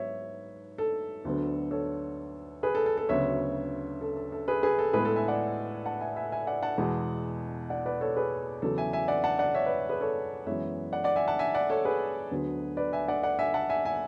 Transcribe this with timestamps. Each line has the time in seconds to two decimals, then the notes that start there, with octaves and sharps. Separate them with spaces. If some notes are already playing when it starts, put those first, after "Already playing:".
Already playing: G#2 F#3 B3 C#5 E5
0.78 A4
1.25 D2 D3 F#3 B3
1.71 A4 C#5
2.63 G#4 B4
2.75 A4
2.86 A4
2.98 A4
3.09 D2 C#3 F#3 B3 C#5 E5
4.01 A4
4.17 A4
4.32 A4
4.48 G#4 B4
4.63 G#4 B4
4.79 A4
4.93 A2 G#3 B3 G#4 B4
5.05 A4
5.16 E5 G#5
5.28 D5 F#5
5.86 F#5 A5
6.01 E5 G#5
6.16 E5 G#5
6.32 E5 G#5
6.47 D5 F#5
6.63 F#5 A5
6.78 E2 B2 G#3
7.70 D5 F#5
7.86 B4 D5
8.01 A4 C#5
8.16 G#4 B4
8.62 E2 C#3 F#3 B3 A4
8.78 E5 G#5
8.93 E5 G#5
9.08 D5 F#5
9.24 F#5 A5
9.39 D5 F#5
9.55 C#5 E5
9.66 B4 D5
9.89 G#4 B4
10.01 A4 C#5
10.47 F#2 E3 G#3 B3 C#5 E5
10.93 D5 F#5
11.04 D5 F#5
11.16 E5 G#5
11.28 F#5 A5
11.39 E5 G#5
11.54 D5 F#5
11.70 A4 C#5
11.85 G#4 B4
12.31 D2 D3 F#3 B3
12.77 B4 D5
12.93 E5 G#5
13.08 D5 F#5
13.23 D5 F#5
13.39 E5 G#5
13.54 F#5 A5
13.70 E5 G#5
13.85 E5 G#5